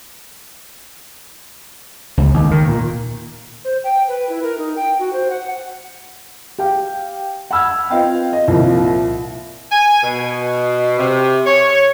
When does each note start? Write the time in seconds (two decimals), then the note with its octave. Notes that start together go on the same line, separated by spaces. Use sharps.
2.17 C#2
2.34 D#2
2.51 D#3
2.68 A#2
3.65 C5
3.84 G5
4.08 B4
4.29 E4
4.43 A#4
4.58 D#4
4.76 G5
4.99 F#4
5.13 C5
5.30 F#5
6.58 G4 F5 G5
7.51 F#5 B5 E6 F6 G#6
7.90 C4 F4 B4 D#5 F5 G5
8.33 D#5
8.48 C2 A#2 F3
9.72 G#5
10.03 B2
10.99 C3
11.46 C#5